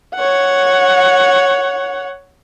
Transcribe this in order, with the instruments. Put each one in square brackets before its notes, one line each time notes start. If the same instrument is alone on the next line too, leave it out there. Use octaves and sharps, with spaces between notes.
[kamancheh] C#5 F#5